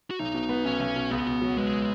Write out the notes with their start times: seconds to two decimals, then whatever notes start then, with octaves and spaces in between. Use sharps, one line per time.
0.11 F#4
0.19 B1 D#4
0.34 B2
0.49 B3
0.65 B1 C#4
0.80 B1
0.96 B2
1.11 C#2 B3
1.26 B2
1.41 F#3
1.57 G#3 B3